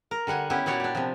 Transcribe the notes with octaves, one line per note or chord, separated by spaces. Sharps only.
A#4
D3 G3 F#5 G#5
B3 C#4 E4 G4
A#2 B3 F#4 C#5 D5
D4 G4
C3 F3